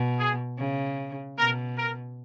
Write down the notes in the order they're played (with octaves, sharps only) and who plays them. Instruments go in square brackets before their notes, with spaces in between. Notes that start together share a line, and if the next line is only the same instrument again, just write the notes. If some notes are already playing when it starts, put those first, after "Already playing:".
Already playing: [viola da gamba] B2
[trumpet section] G#4
[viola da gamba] C#3
[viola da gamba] B2 [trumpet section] A#4
[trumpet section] A#4